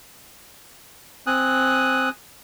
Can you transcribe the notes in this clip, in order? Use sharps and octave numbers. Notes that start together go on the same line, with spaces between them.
C4 G#5 D#6 F#6